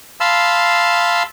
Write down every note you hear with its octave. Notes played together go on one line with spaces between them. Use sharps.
F5 A5 B5 C6 E6